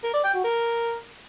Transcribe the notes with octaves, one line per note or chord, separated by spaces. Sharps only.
A#4
D5
G5
F#4
A#4